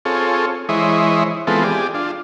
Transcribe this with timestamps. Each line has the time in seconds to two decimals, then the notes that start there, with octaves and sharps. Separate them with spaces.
0.05 C4 F4 G#4 A4 C#5
0.69 E3 G#3 E4 C5 C#5 D#5
1.47 E3 G#3 B3 C4 F4 A4
1.64 G4 G#4 D5
1.94 D4 F4